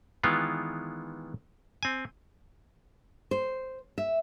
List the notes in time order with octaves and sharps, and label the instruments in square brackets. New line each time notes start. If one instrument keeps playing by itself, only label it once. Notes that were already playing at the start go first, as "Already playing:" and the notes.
[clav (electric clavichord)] D#3 E3 G#3 B3 F4
C4 G#5
[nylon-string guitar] C5
E5